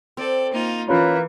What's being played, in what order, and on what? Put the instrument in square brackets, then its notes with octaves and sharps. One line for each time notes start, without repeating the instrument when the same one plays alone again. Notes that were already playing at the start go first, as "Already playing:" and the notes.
[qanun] C4 [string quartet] A4 D5
[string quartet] A#3 D#4 F4
[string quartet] E3 [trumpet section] A#3 B4 [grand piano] C#4 F4